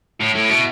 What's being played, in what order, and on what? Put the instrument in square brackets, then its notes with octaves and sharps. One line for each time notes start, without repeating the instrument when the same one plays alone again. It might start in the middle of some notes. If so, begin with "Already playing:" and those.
[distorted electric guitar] A2 [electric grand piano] E4
[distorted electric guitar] A2 [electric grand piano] E4
[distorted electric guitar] B2 [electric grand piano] E4